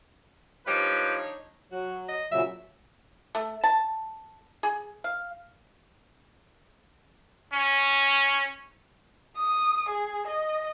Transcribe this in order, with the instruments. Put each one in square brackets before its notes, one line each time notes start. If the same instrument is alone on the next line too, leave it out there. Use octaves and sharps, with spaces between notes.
[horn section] F3 G3 B4 [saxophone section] D4 D#4 C#5
[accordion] F#3 [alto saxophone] F#4
[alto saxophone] D#5
[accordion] A#2 C#3 F#3 [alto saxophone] E5
[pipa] A3
A5
G#4
F5
[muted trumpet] C#4
[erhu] D#6
G#4
D#5